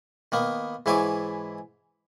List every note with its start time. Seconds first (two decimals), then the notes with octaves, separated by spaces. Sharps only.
0.32 D#3 A#3 B3
0.86 G#2 E3 E4 C#5 G#5 D6